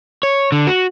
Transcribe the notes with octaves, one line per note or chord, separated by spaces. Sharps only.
C#5
D3
F#4